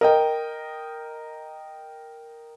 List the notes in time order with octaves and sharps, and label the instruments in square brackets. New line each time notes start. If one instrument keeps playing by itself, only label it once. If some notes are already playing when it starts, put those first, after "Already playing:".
[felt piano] A#4 D#5 G5